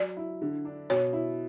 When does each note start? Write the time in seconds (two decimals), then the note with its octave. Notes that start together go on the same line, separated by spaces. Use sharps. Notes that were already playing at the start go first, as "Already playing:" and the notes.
Already playing: F#3 D5
0.17 E4
0.42 D3
0.65 D4
0.90 B2 C#5
1.13 E4